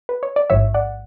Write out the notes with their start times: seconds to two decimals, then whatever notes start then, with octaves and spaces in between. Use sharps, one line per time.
0.09 B4
0.23 C#5
0.36 D5
0.50 A1 G#2 F#3 C#5 E5
0.74 D5 F#5